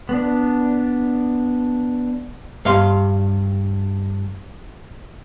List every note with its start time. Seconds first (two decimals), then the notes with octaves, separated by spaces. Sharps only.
0.09 B3 D4
2.65 G2 F5 C6